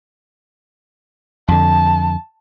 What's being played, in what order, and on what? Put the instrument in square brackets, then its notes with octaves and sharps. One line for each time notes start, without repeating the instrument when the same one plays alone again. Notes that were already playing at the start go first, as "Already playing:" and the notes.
[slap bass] F2 D3 [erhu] A5